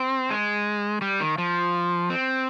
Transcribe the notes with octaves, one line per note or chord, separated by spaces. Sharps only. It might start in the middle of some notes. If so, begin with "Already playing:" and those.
Already playing: C4
G#3
G3
D#3
F3
C4